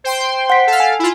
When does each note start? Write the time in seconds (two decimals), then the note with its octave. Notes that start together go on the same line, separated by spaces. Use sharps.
0.04 C5 G5 C6
0.50 F#5 B6
0.67 A4 F5
0.80 G#5
0.99 E4 F4